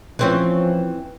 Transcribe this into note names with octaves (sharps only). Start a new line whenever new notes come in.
E3 F3 C4 C#4